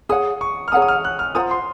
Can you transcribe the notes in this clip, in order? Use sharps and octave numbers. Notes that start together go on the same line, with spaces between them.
G#4 C#5 F#5 D#6
C#6
F6
G#4 C#5 F#5 A#5 D#6
D#6
F6
F#6
F6
F4 C5 F#5 A#5 D#6
C6